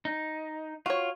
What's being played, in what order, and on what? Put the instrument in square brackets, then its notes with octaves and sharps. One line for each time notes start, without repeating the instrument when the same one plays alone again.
[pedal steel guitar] D#4
[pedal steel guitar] F4 [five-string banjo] F#4 C#5